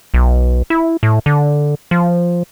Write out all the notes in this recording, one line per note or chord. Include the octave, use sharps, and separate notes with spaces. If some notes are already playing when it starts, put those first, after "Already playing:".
B1
E4
A2
D3
F3